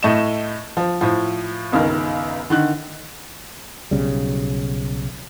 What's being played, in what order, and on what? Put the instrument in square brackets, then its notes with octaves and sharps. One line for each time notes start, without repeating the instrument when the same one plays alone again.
[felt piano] A2 A3 D#5 E7
F3
A2 F3
G1 C#2 D#3 A#4
D3 D#3 F#6
[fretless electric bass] B1 C#3 G3